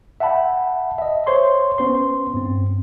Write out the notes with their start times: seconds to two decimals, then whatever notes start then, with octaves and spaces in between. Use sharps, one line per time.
0.20 E5 F#5 G5 A5 B5
0.98 D#5 E5
1.26 C5 C#5 C6 C#6
1.78 B3 C#4 C5 C6
2.34 G2 C4